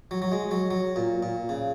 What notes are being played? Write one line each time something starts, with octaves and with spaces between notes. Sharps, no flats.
F#3
F#3
G#3
F#3
F#3
A#2
A#2
C#3